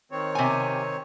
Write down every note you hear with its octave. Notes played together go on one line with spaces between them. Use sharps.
D#3 C4 C#5
C3 G#5